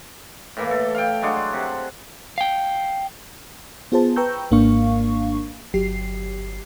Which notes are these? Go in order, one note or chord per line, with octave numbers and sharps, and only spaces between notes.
A2 E3 A#3
A4
F5 G5
F#3 G#3 D4 F#5
C3
F5 G5
B3 F4 G#4 C5 A5
B4 G5 A#5 C#6 E6 G6
G#1 G#2 A#3 D4 F5 C#6
G1 F#3 G4 C7